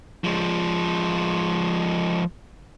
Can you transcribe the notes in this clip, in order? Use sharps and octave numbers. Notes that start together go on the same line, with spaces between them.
F3 G#3